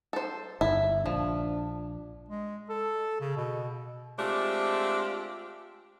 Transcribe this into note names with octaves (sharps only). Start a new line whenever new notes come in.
A4 C5
G1 E4
A#1 F3 D4
G#3
A4
C#3
B2
G#3 A3 C4 D4 F4 G4